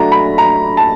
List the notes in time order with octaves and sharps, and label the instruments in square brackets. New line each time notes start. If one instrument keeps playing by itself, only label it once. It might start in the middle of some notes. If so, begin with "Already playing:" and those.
Already playing: [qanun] F#3 A3 D4 [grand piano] A#5
[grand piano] B5
A#5
A5